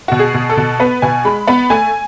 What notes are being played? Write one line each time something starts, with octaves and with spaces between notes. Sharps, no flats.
B2 F#4
G#4
B2
A4
B2
B3 B4
B2 G#5
G#3 B5
B3 B5
A3 G#5